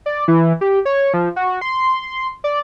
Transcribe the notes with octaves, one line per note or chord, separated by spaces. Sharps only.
D5
E3
G4
C#5
F3
F#4
C6
D5